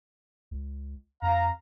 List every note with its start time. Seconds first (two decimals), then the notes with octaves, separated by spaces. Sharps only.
0.51 C#2
1.22 F2 F5 A#5